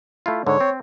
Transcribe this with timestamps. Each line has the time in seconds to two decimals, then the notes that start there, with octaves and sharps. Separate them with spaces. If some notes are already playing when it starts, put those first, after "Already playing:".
0.26 A3 E4 F4
0.46 G#2 D3 C#5
0.61 C4